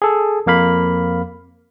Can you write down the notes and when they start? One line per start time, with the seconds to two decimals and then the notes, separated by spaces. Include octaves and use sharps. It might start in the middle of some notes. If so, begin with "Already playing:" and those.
0.02 G#4 A4
0.46 F2 A#3 F5 B5